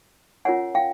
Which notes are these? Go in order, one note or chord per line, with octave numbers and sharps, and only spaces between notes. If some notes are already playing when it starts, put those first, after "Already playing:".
C#4 F4 A#4 C#5 F#5 G#5
F5 G5